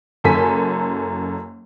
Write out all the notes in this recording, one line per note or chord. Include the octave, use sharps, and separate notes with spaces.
F#1 F#2 A4 G#5 B6